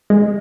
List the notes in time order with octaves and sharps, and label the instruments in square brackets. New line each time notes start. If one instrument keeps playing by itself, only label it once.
[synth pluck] G#3